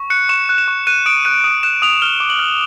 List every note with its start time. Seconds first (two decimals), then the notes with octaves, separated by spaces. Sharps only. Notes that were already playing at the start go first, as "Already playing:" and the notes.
Already playing: C#6
0.10 F#6 C#7
0.29 C#6 E7
0.49 F#6
0.58 E7
0.68 C#6
0.87 F#6 D#7
1.06 D#6 D7
1.25 F#6 D#7
1.44 D#6 D#7
1.63 F#6 E7
1.82 D#6 F7
2.02 F6 G7
2.20 D6
2.30 F#7
2.39 F6